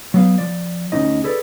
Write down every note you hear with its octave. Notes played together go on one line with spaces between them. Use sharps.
F#3 B3 F5
F3 D5
D2 D#3 C#4 D#4 D#5
G#4 A4 B4 D5